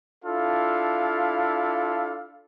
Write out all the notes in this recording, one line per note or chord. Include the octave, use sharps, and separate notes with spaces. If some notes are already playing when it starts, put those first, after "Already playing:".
D4 E4 F4 A4 F5